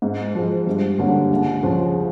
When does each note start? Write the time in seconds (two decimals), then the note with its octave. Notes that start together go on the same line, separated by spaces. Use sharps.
0.02 G#2
0.35 F3 G#3
0.67 G2
0.99 D3 G3 A#3 C#4
1.31 C#2
1.63 C#3 F3